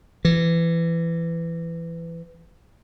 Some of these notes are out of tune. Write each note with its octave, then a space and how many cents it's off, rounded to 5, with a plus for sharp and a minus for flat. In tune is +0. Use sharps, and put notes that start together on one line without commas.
E3 +20